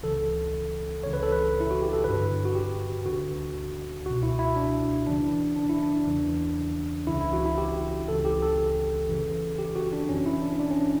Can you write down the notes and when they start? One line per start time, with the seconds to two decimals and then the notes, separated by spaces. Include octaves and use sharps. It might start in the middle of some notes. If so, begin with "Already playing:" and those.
0.03 C#2 C#3 E3 A4
1.03 C#2 C#3 E3 C#5
1.13 B4
1.23 A4
1.32 B4
1.60 E4
1.71 F#4
1.82 G4
1.93 A4
2.04 G2 D3 B4
2.45 F#4
2.55 G4
3.05 D2 D3 F#4
4.05 C#2 B2 F#4
4.23 E4
4.39 E4
4.56 D4
5.06 F#2 C#3 E3 D4
5.56 D4
5.70 E4
5.82 D4
6.07 E2 C#3 E3
7.07 C#2 C#3 E3 E4
7.21 E4
7.33 F#4
7.46 E4
7.58 G4
8.08 C#2 C#3 E3 A4
8.25 G4
8.42 A4
9.09 F#2 C#3 E3
9.59 G4
9.76 F#4
9.93 D4
10.09 F#2 E3 C#4
10.26 E4
10.42 D4
10.60 D4
10.70 C#4